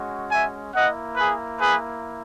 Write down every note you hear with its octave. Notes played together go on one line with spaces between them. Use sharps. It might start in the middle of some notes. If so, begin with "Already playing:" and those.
Already playing: G#3 C#4 F#4
E5 G#5
A#3 E4 D#5 F#5
G#4 B4
G#4 B4